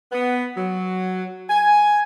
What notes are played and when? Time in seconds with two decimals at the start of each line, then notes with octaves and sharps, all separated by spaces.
0.12 B3
0.56 F#3
1.50 G#5